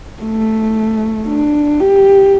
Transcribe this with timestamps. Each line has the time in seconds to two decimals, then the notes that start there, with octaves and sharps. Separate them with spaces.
0.22 A3
1.27 D4
1.80 G4